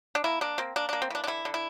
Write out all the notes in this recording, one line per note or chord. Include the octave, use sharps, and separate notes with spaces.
D4
A#3 E4
A#3 D4
A#3 C4
A#3 D4
A#3 D4
C4
E3 D4
D4
D3 E4
D3
E4